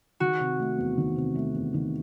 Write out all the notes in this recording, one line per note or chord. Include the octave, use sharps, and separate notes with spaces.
D#3 F#4
C3
A3
E2
D#3
C3
A3
E2
D#3